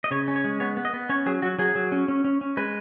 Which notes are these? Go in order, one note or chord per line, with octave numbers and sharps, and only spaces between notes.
D#5
C#3 C#5
C#4
C#5
G#3
B3 C#5
B3
D#5
B3
C#4 C#5
F#3 G#4
F#3 F#4
F#3 G#4
F#3
C#4
C#4
C#4
C#4
G#3 B4